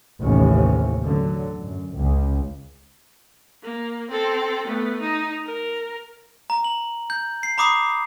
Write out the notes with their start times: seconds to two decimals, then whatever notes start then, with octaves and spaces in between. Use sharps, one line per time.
0.21 A1 D#2 A2 C3 E3 C#4
1.02 D3 F#3
1.60 F#2
1.95 C#2 C#3
3.62 A#3
4.10 C4 A4
4.67 A3 B3
5.01 D#4
5.46 A#4
6.50 A#5
6.64 F#7
7.10 G6
7.43 C7
7.58 A#5 B5 D6 D#6 C7